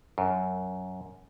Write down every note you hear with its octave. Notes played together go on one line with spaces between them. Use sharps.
F#2